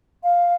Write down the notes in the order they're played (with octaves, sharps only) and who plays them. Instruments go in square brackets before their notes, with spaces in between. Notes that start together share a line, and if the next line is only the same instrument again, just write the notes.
[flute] F5